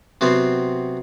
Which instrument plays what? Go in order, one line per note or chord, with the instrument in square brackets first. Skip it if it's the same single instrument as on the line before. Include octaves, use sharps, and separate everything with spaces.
[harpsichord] C3 F#3 B3 C4